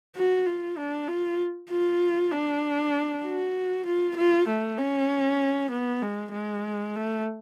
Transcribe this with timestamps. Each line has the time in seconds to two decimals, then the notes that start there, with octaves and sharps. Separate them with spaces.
0.16 F#4
0.46 F4
0.77 D4
1.08 F4
1.70 F4
2.32 D4
3.24 F#4
3.86 F4
4.17 F4
4.48 A3
4.78 C#4
5.71 B3
6.02 G#3
6.33 G#3
6.96 A3